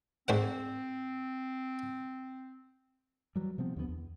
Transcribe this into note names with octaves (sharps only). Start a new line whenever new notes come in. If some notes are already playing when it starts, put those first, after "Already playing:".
G#2 C4 C5 F#5
E3 F#3 G3
C3 F3 B3 C4
D#2 D3 E3 B3
E2